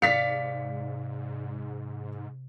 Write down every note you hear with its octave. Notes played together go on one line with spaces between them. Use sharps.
G#2 C3 D5 F5 B6 C#7